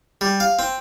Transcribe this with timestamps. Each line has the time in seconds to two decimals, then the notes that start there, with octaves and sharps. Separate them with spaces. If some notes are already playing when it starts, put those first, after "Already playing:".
0.21 G3
0.40 F5
0.59 C4